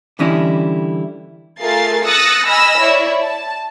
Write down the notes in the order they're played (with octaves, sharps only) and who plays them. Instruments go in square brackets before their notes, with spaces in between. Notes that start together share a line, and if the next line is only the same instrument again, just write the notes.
[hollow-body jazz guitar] D3 E3 G3 C#4 E4 D#5
[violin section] A3 F4 G#4 A#4 A6 C7
D#6 E6 F#6 A6 A#6 C#7
D#5 G#5 B5 E6 F6 A#6
E4 C#5 D5
A5